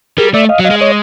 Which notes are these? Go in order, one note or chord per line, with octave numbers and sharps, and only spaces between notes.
G3 G#4 A#4
A3 D5 E5
D#5 F5
F#3
D#5 F5
G#3
C#5 D#5